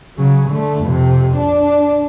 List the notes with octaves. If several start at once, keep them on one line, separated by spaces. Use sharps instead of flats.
C#3 F#3
D3 A3
F2 C3
D4